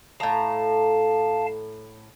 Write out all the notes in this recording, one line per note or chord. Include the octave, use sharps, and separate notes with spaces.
A2 F5 A5 A#5